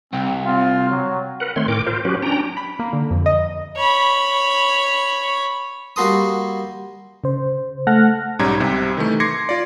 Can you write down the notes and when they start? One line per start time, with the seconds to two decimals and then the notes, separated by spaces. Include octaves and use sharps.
0.13 C2 C4
0.46 C4 F4
0.90 F#3
1.40 A#4 B4 F#5
1.56 D#3 A3 C4 C#5 C6
1.68 A2 A#4 G5 D6
1.86 F4 A#4 C5
2.05 F#3 C#4 F#4 G4 B4
2.22 C#4 D4 G5 A#5
2.57 B5
2.79 A#3
2.93 D3
3.11 F2
3.26 D#5
3.77 C#5 B5
5.96 G3 A#3 F#4 A4 C6 D#6
7.24 C#3 C5
7.87 A3 F#5 A5 F6 F#6 A#6
8.39 B1 G#2 G3 C#4 A#5 G#6
8.60 C2 C3
8.97 D#3 E3 A3
9.20 C6 D6 G#6 A#6 C7 C#7
9.49 F4 D5